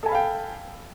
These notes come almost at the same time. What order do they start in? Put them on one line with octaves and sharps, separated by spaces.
A4 G#5 B5 F5 G5